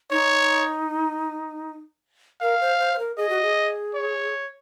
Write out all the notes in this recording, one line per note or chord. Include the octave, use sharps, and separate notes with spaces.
D#4 C#5
A#4 F5
C5
C5
C5
A#4
G#4 D#5
F#4
G#4
C#5